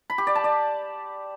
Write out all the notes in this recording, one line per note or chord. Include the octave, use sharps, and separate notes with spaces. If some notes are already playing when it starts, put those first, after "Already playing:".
B5
G4
D5
A5
D5